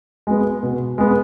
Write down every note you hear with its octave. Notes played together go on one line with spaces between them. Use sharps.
G#3 B3
B2
G#3 B3